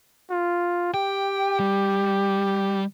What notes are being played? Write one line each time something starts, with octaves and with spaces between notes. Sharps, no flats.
F4
G4 G5
G3